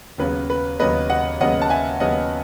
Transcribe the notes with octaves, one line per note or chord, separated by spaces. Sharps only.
D#2 C#3 F#3 B3 B4
B4
D#2 C#3 F#3 B3 B4 D#5
D#5 F#5
D#2 C#3 F#3 B3 D#5 F#5
A5
E5 G#5
D#2 C#3 F#3 B3 D#5 F#5